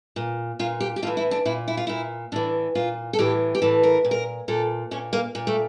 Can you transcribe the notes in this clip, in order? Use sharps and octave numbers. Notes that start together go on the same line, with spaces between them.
A#2
A#2 F4
G4
G4
A2 E3 F4
E4
D4
A#2 E4
E4
F4
A#2 E4
A2 E3 D4
A#2 F4
A4
A2 E3 G4
G4
A2 E3 A4
A#4
A#2
A#4
A#2 A4
A#2 C#4
A#3
A#2
A3